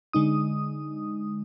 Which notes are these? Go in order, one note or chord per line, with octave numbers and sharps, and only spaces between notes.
D3 G#3 D#4 D#6